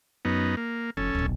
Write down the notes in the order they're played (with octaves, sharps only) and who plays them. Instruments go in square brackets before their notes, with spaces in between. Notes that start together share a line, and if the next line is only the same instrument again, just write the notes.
[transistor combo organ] F#2 B3 D#4
A#3
[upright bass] F1 [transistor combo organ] C#4 A4
[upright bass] D1 B1